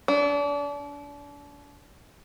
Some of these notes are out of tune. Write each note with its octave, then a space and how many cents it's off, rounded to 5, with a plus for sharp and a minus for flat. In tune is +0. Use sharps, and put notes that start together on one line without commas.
D4 -35